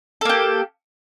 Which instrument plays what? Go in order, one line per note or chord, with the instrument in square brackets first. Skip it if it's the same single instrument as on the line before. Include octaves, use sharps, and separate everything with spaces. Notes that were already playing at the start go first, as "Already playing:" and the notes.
[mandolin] A4
A#3
G4